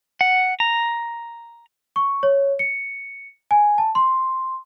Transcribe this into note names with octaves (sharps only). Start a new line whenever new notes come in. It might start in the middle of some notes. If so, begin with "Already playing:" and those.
F#5
A#5
C#6
C#5
C#7
G#5
A5
C6